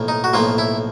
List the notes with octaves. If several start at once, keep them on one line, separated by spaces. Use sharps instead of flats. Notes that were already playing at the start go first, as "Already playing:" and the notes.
Already playing: B1 A2 F3 A#3
D#4
F#4
B1 A2 F3 A#3 F4
E4